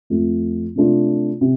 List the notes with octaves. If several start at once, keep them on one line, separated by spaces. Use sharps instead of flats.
F2 F3 A3
C3 A3 D4 F4
C3